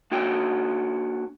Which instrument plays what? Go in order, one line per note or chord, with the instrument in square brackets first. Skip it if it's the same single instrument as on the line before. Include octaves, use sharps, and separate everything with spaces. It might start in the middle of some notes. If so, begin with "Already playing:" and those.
[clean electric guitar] A#3 D4 F#4 C#5 G5